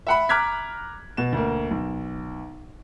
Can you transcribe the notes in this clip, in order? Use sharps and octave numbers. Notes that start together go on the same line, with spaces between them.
E5 F#5 B5
A#5 D6 F6 F#6 G#6 B6
B2 E7
D2 A#3
B1